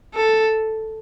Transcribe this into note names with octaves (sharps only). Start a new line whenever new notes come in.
A4